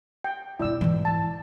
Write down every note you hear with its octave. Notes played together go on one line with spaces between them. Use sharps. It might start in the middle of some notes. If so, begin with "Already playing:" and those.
G5
G2 B2 E4 D5 E6
G#2 E3
A5